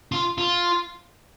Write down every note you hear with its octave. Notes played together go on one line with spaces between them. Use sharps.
F4
F4